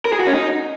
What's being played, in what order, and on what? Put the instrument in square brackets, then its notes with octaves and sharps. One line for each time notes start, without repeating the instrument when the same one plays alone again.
[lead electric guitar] A#4
G#4
F#4
C#4
D#4